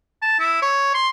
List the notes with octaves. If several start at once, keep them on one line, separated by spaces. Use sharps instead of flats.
A5
E4
C#5
C6